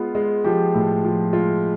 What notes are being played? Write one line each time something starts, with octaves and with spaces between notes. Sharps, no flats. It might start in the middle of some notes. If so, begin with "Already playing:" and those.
Already playing: G#3 B3 F4
G#3
F3 G4
A2
F3
G#3 F4